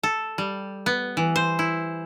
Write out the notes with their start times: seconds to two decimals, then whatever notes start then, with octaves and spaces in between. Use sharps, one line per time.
0.03 A4
0.38 G3
0.86 B3
1.17 E3
1.36 C5
1.59 E4